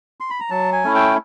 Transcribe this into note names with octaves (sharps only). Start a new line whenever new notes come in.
C6
B5
A#5
F#3 A5
G#5
A3 C#4 E4
G5